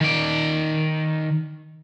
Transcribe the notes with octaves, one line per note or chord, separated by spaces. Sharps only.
D#3 D5